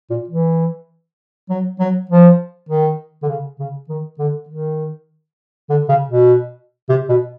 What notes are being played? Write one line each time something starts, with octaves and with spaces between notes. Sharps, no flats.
A#2
E3
F#3
F#3
F3
D#3
D3
C#3
C#3
D#3
D3
D#3
D3
C#3
B2
C3
B2